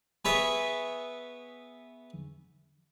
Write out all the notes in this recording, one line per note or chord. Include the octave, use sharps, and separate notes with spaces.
B3 G#4 B4 C#5 E5